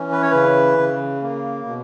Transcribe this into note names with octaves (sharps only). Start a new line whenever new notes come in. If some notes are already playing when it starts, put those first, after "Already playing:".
Already playing: E3 C#4
B4
C#5
C#3 B4
C#3
A#3
B2